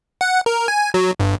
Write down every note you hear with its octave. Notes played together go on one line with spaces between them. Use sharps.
F#5
A#4
G#5
F#3
G1